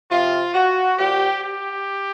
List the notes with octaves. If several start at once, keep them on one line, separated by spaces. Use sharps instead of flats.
C3 F3 F4
F#4
A#2 F3 G4
G4